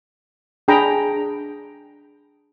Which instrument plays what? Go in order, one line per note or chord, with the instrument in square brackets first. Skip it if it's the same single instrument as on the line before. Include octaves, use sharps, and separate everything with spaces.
[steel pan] D4 G#4 G5 A#5 B5